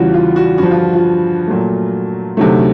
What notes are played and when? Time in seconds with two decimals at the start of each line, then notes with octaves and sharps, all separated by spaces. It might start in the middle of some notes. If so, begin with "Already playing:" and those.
Already playing: E2 C#3 E3 G3 F4 F#4
0.14 F4
0.36 F#4
0.58 G2 D3 F3 F#4
0.71 F4
0.94 F4
1.47 A#2 F#3 A3
2.37 D2 C3 D#3 F#3 A3